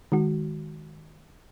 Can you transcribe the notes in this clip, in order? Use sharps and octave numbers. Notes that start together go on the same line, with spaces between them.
D#3 G#3 F#4